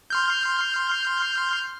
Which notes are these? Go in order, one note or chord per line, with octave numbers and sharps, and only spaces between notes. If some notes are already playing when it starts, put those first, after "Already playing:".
C6 F6 G6